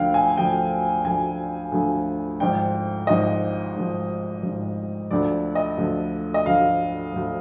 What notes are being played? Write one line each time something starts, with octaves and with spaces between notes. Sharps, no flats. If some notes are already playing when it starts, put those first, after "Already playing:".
Already playing: D2 D3 F3 F5 G5
G#5
D2 D3 F3 G5
D2 D3 F3 G#5
D2 D3 F3
G#1 G#2 F3 G5
G#1 G#2 F3 D#5
G#1 G#2 F3
G#1 G#2 F3
D2 D3 F3 D5
D#5
D2 D3 F3
D#5
D2 D3 F3 F5
D2 D3 F3